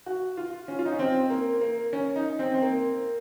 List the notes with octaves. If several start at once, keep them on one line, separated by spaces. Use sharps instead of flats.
F#4
F4
C#4
F4
D#4
C#4
C4
A#3
A#3
C#4
D#4
C4
C4
A#3